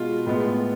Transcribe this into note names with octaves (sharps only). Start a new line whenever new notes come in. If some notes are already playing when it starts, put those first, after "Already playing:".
Already playing: B2 G#3 B3 F4
A2 G#3 B3